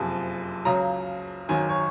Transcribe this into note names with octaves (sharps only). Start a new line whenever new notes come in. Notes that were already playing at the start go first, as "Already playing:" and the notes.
Already playing: F#1 F2 C3 F3 G#5
C#2 C#3 F#3 A#5
G#1 F#2 D#3 F#3 G#5
C#5